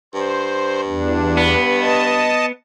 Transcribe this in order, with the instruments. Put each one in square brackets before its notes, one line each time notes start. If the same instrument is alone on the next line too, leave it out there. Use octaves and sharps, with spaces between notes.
[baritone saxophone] G2 [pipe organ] C5
[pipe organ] E2 D4
[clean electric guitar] B3
[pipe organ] D#5 A5